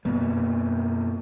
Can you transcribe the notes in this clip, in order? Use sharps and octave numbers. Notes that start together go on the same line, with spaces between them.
F#2 B2 A#3 B3